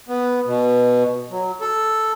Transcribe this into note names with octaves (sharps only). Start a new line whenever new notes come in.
B3
B2
F#3
A4